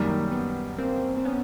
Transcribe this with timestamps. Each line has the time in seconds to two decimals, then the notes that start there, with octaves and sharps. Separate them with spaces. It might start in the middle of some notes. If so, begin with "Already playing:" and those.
Already playing: F#2 D#3 G3 A#3
0.32 B3
0.78 A#3 C4
1.17 C4
1.25 B3 C#4